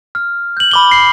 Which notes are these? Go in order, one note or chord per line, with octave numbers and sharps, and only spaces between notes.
F6
G6 F#7
B5 D6 G7
C7